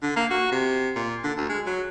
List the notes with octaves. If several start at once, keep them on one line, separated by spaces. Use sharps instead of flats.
D3
A#3
F#4
C3
A#2
D3
D2
G#3
F#3